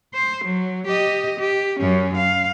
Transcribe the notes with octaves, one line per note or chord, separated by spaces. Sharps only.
C5
F#3
G4 D#5
G4
F#2 C#4
F5